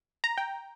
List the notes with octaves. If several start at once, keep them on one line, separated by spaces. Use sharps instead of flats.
A#5
G5